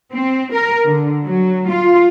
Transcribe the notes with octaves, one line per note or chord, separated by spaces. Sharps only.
C4
A#4
D3
F#3
F4